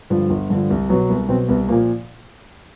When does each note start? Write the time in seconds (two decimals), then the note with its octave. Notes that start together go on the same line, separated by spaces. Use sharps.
0.10 G2 D3 F3
0.30 G1
0.50 G2 D3 F3
0.70 C2
0.89 B2 F#3 B3
1.10 C2 B3
1.29 B2 F#3 C4
1.49 C2 B3
1.69 A#2 F3 A#3